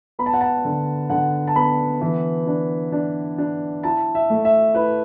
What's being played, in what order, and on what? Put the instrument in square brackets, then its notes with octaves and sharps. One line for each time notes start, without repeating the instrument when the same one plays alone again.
[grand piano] B3 B5
A5
F#5
A5
D3
D3 F#5
A5
B3 B5
E3
D4
D4
D4
E4 A5
E5
A3
E5
E4 B4